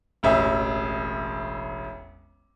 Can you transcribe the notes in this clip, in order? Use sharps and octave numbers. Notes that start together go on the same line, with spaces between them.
E1 A1 E5